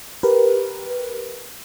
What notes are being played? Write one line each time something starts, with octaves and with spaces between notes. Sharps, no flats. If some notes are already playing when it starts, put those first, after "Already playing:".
G4 A#4 B4